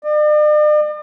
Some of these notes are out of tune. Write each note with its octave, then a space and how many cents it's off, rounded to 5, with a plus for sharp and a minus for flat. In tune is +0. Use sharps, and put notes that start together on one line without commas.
D5 +45